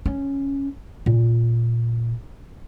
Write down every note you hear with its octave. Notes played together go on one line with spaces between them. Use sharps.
C#4
A#2